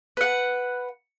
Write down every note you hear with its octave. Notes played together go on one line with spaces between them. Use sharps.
B4 F#5